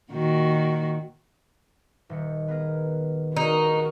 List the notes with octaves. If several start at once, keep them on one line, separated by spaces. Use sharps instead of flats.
A#2 D#3 F#4
D#1 D#3 C#7
B3 G#4 A#4
D#4 F#4 G#4 A#4 G5